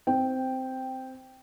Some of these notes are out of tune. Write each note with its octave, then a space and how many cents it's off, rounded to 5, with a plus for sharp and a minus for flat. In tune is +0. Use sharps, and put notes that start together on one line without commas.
C4 -10 G5 +0